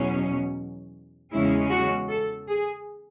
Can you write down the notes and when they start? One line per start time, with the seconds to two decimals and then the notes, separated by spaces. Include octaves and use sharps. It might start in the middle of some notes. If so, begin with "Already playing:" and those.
Already playing: E2 B2 F#3 C#4
1.32 E2 C#3 G#3 C#4 E4
1.71 F#4
2.09 A4
2.49 G#4